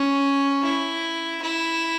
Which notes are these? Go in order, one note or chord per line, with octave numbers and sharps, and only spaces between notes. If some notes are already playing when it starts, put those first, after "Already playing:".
Already playing: C#4
E4
E4